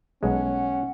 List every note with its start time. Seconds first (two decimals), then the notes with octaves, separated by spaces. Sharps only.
0.23 B1 G#3 C#4 F#5